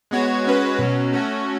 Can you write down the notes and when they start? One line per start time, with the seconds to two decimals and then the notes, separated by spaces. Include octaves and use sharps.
0.11 G#3 B3 F#4 C#5
0.44 G#3 C#4 F#4 B4
0.79 B2 F#3 C#4
1.13 A3 C#4 F#4